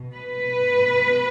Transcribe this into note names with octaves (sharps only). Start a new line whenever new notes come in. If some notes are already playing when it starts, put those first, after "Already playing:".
Already playing: B2
B4
B2